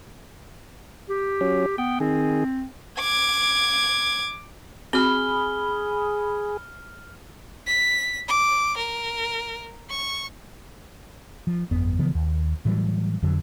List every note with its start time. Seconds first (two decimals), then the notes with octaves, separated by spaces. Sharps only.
1.09 G4
1.41 F#3 C#4
1.78 B3 G5
2.00 D#3 C4 G#4
2.99 D6 G#6
4.93 C4 F#4 G#4 B5 F6 G7
7.67 B6
8.28 D6
8.77 A#4
9.90 C#6
11.47 F3
11.71 G1 F2 B3
11.99 C#3 E3 F3 B3
12.15 D#2
12.65 A2 E3 F#3 G3
13.22 F2 D3 F#3